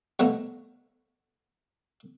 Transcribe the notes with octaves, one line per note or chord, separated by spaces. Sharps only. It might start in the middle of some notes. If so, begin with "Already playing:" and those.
C2 B2 F3 A3 B3 A#5